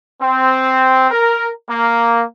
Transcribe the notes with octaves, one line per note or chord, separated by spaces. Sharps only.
C4
A#4
A#3